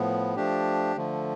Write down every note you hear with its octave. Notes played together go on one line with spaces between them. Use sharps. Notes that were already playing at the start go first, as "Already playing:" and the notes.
Already playing: A2 F3 B3
F3 A3 D4 G4
D3 F3 A3